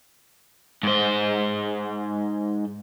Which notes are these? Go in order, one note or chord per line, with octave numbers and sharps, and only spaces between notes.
G#2 C5